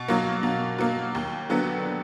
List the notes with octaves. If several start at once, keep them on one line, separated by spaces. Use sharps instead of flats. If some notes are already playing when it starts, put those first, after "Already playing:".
Already playing: B2
F#3 A#3
B2
F#3 A#3
D#2
D3 F#3 B3